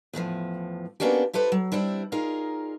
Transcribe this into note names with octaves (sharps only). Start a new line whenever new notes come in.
E2 A2 D#3 F3
A#3 B3 C#4 D4 F#4 G4
E4 G4 A4 B4 C5
F#3
G3 C4 D4 E4
D#4 F4 G#4 A#4 D5